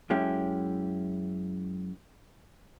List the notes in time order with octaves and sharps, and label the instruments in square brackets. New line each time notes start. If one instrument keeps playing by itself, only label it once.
[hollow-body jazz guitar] F#2 G#3 C#4 E4 G4